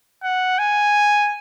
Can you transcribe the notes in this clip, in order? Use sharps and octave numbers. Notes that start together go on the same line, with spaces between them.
F#5
G#5